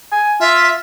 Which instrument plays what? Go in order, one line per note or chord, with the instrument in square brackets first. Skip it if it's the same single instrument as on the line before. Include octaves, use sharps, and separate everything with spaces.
[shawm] G#5
[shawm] F4 [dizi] E5